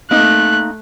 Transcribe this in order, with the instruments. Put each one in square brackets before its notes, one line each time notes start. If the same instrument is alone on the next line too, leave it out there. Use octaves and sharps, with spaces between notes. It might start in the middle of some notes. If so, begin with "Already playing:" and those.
[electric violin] A3 F#6 [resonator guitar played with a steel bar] A#3 C4 D#4